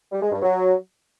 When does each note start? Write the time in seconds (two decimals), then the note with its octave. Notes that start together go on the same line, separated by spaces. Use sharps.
0.12 G3
0.22 G#3
0.32 G2
0.42 F#3